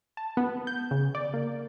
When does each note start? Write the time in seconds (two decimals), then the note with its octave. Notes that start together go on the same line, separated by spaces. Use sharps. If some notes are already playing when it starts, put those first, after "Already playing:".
0.17 A5
0.37 B3
0.67 G6
0.91 C#3
1.15 D5
1.34 A#3